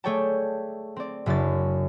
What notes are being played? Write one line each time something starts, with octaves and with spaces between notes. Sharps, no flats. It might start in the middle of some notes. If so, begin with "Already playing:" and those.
A3 G#4 C#5 D5 G5 A5
C4 D5
F#1 F#2 C#3 D4 A6